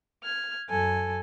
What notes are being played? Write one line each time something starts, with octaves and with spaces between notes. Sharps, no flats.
F6 G#6
F#2 A4 G#5